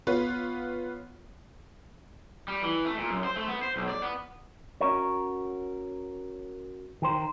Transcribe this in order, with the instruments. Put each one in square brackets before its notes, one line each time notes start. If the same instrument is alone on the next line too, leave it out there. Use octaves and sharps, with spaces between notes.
[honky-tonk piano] B3 F4 B4 C#5
[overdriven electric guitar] G3
E3
A3
A#2
F#2
C5
A3
B3
C5
B1
D5
B3
[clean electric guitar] C#4 F#4 A#4 C#5
D#3 A#4 C5